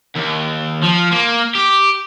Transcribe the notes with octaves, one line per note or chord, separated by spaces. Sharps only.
D#2
F3
A#3
G4